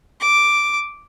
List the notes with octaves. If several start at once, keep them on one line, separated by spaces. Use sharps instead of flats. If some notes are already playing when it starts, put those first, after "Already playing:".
D6